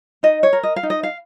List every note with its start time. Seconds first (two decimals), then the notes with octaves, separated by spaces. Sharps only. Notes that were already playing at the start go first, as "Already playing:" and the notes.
0.23 D#4 D#5
0.43 C#5
0.53 A#4
0.63 D#5
0.76 F5
0.83 D#4
0.90 D#5
1.03 F5